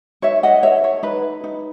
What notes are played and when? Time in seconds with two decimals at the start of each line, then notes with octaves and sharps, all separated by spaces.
0.22 D#4 C#5 E5
0.43 D#5 F#5
0.63 A4 C#5 E5
0.84 C#5
1.03 D#4 B4
1.44 D#4